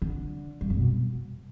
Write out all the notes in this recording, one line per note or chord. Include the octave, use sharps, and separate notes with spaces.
D3
G2
F2
B2